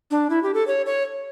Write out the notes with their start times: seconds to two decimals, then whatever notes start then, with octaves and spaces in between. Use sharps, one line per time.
0.11 D4
0.30 E4
0.43 G4
0.54 A4
0.67 C#5
0.86 C#5